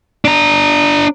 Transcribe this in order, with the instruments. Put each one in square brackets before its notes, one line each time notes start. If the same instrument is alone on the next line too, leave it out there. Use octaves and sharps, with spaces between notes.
[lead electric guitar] D4 A#5